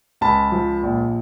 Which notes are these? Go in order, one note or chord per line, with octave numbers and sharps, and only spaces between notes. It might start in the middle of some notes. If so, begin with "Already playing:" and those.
C#2 A5 B5
F3
A#1